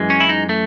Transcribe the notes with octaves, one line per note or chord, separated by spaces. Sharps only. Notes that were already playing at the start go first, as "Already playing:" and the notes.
Already playing: F#2 E3 G#3
C#4
E4
D#4
A3